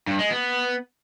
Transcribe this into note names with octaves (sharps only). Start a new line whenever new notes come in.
G2
G#3
B3